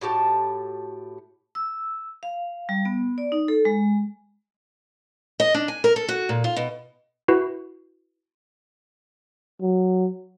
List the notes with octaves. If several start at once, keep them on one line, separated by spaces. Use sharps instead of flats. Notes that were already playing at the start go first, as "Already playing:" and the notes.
A2 F#4 G4 A5
E6
F5
G3
B3
D5
D#4
A4
G#3
D#5
D4
G#5
A#4
A4
F#4
A#2
F4
B2
E4 F#4 B4
F#3